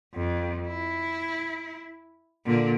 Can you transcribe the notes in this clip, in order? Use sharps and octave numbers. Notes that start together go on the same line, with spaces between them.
F2
E4
A#2 D3